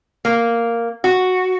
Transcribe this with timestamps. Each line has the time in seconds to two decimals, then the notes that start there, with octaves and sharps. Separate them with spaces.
0.25 A#3
1.04 F#4